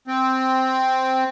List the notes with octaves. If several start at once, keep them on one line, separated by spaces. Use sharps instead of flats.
C4